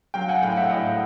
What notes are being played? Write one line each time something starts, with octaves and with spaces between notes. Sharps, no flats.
F#3 F5 G5
F#5 G#5
A2 F5 G5
E5 F#5
A2 D#5 F5